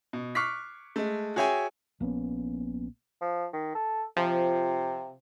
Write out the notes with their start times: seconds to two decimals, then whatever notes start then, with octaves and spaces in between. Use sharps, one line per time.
0.13 B2
0.35 C#6 D6 F6 F#6 B6 C7
0.96 G#3 A3
1.36 F#4 G#4 C#5 E5 G5 G#5
2.00 A#1 A#3 B3 C#4
3.21 F3
3.53 D#3
3.75 A4
4.17 C3 F3